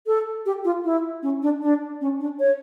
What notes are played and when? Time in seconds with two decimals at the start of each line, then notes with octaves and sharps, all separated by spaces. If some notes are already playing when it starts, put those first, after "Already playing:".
0.07 A4
0.46 G4
0.65 F4
0.84 E4
1.23 C#4
1.42 D4
1.62 D4
2.01 C#4
2.20 D4
2.39 C#5